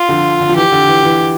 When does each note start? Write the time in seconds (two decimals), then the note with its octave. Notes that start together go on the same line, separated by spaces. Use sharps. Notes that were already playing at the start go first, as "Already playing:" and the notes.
Already playing: F4
0.08 D3 F3
0.40 D3
0.49 F3
0.56 E3 G4
0.72 D3
0.88 E3
1.03 E3